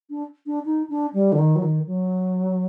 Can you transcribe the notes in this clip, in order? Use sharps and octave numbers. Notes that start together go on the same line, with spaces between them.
D4
D4
D#4
D4
G3
D3
D#3
F#3
D#3
F#3